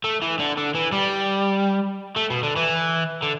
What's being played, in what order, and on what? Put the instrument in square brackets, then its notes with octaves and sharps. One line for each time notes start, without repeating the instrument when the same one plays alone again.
[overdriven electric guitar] A3
E3
D3
D3
E3
G3
A3
B2
D3
E3
D3